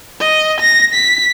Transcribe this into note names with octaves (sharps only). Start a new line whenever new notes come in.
D#5
A#6
B6